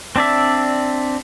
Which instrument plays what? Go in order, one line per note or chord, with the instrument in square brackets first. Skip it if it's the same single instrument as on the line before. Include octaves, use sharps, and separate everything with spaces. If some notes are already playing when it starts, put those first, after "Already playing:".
[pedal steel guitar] C4 D4 D5 E5